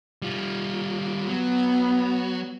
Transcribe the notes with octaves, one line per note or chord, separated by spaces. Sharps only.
G3 F4
F#3 B3